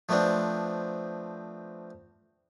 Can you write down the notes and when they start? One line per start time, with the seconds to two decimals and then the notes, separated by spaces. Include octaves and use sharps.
0.09 F3 A3 B3 C4 D4